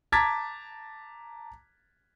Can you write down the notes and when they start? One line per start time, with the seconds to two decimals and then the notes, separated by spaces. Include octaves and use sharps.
0.12 A5 A#5 D6 G#6 A6 B6